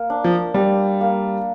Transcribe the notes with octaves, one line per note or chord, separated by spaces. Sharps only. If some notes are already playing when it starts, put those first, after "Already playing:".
Already playing: A#3
D4
F3
G3 D4
A#3